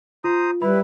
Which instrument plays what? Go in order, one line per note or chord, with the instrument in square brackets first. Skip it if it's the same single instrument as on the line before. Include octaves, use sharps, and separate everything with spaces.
[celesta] F4 [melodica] C5 A#5 D#6
[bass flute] G3 [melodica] E4 [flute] B4 [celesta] B5